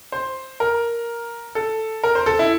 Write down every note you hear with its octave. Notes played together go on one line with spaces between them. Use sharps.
C5
A#4
A4
A#4
C5
A4
E4